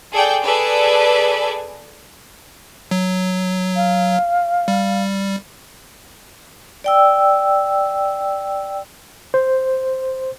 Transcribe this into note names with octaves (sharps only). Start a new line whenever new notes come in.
G#4 A4 D5 G5
G#4 A4 B4 D5 G#5
F#3
F5
G3
D5 G5 E6
C5